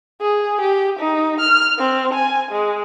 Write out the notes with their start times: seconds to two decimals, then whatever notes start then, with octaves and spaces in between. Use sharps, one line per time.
0.21 G#4
0.61 G4
0.99 D#4
1.41 F6
1.79 C4
2.14 G#5
2.52 G#3